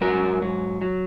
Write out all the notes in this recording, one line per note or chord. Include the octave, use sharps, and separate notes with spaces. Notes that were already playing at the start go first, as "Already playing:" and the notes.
G#2 F#3 F#4 A#4
G#2 F#3
F#3